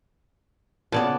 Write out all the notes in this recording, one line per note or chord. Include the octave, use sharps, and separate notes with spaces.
A#2 C#3 B3 D5 A5